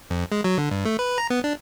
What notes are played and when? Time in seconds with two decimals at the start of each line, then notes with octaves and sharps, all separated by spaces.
0.10 F2
0.32 G#3
0.44 F#3
0.58 D3
0.71 G2
0.85 A3
0.99 B4
1.18 A#5
1.30 B3
1.44 D4